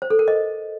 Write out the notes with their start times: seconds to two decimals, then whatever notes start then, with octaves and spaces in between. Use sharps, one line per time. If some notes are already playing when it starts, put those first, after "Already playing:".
0.02 C5
0.10 A4
0.19 A#4
0.28 D#5